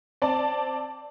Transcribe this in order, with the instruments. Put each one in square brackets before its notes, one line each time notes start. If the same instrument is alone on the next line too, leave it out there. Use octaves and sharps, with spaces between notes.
[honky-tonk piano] C4 D5 A5